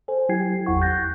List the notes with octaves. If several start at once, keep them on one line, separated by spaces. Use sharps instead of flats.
A4 C5 G#5
F#3 E4 G4 G5 G#6 C7
G#1 E2 E4 F#5 C#6
F#6 G6 A6 A#6